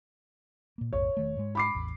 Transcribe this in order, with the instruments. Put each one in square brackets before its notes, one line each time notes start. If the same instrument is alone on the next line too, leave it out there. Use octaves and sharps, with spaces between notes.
[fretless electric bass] A#2 A#3
[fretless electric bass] A#1 F2 G#2 [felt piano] C#5
[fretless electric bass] E1 D#3 A3
G#2 G#3
[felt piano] B5 D6 C7
[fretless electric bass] A1 E2